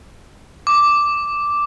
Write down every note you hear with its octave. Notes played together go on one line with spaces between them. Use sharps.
D6